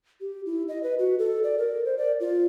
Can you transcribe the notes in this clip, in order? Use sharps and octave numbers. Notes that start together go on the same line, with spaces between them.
G4
E4
D#5
B4
F#4
A4
D5
A#4
C5
D5
F4